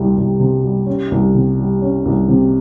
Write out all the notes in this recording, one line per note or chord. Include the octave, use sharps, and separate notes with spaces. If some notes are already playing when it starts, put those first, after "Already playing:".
Already playing: C2 C3 G3
C2
C3
G3
C#4
C2
C3
G3
C#4
C2
C3